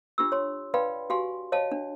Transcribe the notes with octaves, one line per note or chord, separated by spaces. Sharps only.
D4 F4 G4 E6
C#5 C6
B4 D5 F5 G5 B5 C6
F#4 G4 F5 G#5 C6
C#5 D#5 F5 A5
D4